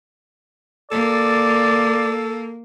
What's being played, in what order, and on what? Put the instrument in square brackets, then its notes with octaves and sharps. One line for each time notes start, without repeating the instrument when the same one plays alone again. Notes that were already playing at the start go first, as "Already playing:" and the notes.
[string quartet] A#3 [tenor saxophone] A4 [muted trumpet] D5